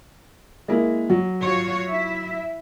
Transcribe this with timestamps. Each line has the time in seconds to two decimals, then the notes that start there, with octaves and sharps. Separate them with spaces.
0.68 G#3 A#3 E4
1.10 F#3
1.41 F4 F#4 C#5
1.87 E4 E5